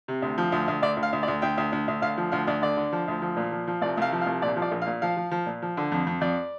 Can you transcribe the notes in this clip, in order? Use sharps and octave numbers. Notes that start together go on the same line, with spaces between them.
C3
D2
F3
D2
D2
D2 D5
D2
F5
D2
D5
D2
D2 G5
D2
D2
D2
D2 F5
F3
D2 F5
D2 D5
D3 D5
D3
F3
D2
F3
A#2
F3
F3
C2 D5
C2 F5
F3
F5
C2
A#2 D5
F3
D5
A#1
F5
A#2
F3 F5
F3
F3
A#2
F3
D3
F2
F2
F2 D5